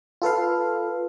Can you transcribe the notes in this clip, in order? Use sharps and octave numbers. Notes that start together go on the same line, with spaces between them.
F4 A4 B4 F5